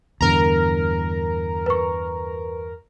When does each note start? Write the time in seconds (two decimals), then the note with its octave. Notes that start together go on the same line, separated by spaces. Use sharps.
0.21 E2 G2 D3 A#4 A#5
1.66 B4 C#6